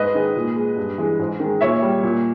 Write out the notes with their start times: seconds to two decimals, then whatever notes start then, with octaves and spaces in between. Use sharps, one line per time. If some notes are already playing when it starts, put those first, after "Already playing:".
Already playing: G#2 B4 D#5
0.15 D#3 G#3
0.36 A#2
0.56 G#3
0.77 G2
0.98 E3 G#3
1.20 G#2
1.40 D#3 G#3
1.61 A#2 C#5 E5
1.82 G3
2.03 A#2